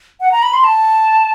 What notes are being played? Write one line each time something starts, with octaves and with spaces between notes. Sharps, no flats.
F#5
A#5
B5
C6
A5